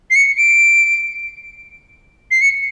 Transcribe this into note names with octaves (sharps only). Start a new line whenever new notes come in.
C7
C#7
D7
C7
C#7